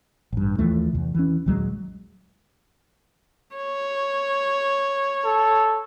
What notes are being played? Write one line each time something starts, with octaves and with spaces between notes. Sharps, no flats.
A1 G2
D#2 E3 F3 A3
E2 C3
E3 C#4
A#1 D#2 F#3 G#3
C#5
A4